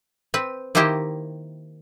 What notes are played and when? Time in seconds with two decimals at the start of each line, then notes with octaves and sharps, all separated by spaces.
0.34 C4 B4
0.75 D#3 A#3 E4 G4 C5 D#5